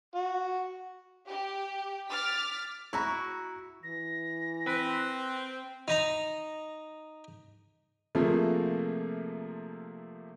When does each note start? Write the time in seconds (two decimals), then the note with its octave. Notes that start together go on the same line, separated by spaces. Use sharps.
0.15 F#4
1.29 G4
2.11 D6 F6 A6 B6
2.93 E4 F#4 A#5 C#6
3.83 E3 A#6
4.67 C4 B4
5.88 D#4 A#5
8.15 C3 F3 A3 A#3 F4 G#4